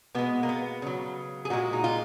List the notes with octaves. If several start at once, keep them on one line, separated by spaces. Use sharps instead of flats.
B2 G#3 B3
A#3
B3
C#3 F#3
G#4
A#2 G#3 F#4
D#4
F4